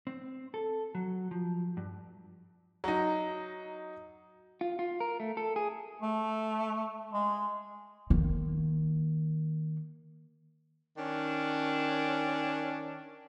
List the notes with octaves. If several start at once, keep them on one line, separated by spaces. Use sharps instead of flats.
C4
A4
F#3
F3
G2
F#3 D#4
F4
F4
A#4
A3
A4
G#4
A3
G#3
D#3 A#3
D#3 C#4 D4